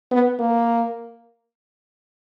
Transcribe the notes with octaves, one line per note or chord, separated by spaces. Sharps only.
B3
A#3